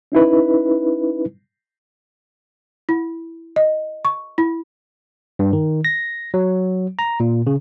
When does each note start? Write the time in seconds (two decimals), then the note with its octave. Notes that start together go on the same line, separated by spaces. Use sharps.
0.12 C#4 D#4 E4 B4
2.89 E4
3.56 D#5
4.05 C#6
4.38 E4
5.39 G2
5.53 D#3
5.85 A#6
6.34 F#3
6.99 A#5
7.20 A#2
7.47 C#3